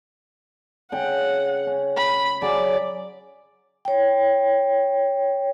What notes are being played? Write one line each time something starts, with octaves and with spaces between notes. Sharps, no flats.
C#3 F#5 G5
C#4
B5
C#3 F#3 G#4 D5
C#5 G5